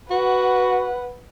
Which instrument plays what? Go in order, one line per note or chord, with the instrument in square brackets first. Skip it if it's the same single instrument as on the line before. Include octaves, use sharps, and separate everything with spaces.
[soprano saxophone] F#4 [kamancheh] B4 F#5